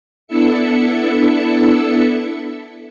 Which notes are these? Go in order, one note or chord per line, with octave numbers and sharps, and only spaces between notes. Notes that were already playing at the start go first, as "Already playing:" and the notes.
B3 D4 E4 A4 E5 C#7